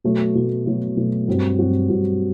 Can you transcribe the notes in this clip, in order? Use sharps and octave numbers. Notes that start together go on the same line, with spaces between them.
B2 F#3 A3
B2 F#3 A3
B2 F#3 A3
B2 F#3 A3
G2 F#3 C4 F#4
G2 F#3 C4 F#4
G2 F#3 C4 F#4